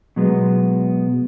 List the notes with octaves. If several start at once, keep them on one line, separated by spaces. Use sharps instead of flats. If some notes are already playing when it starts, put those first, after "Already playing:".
B2 F#3 G#3 B3